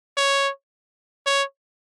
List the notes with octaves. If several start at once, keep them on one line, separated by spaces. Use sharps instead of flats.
C#5
C#5